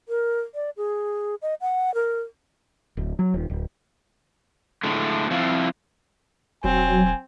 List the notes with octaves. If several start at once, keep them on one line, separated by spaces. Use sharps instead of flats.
A#4
D5
G#4
D#5
F#5
A#4
D1
F#3
D#1
D1
A2 D3 G#3 A3
F3 C4 E4 F4
E1 F#3 C4 G#5